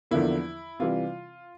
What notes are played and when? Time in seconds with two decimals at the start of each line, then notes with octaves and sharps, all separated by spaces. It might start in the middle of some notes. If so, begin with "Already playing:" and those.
0.11 E2 D3 F3 A#3 E4
0.79 C3 E3 G3 F4